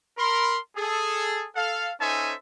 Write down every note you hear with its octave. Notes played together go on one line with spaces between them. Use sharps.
A#4 B5 C6
G#4 A4
A4 F5
C#4 D#4 A4 C5 E5 G#5